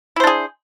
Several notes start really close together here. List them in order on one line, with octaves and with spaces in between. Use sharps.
E4 C5 D4 G#4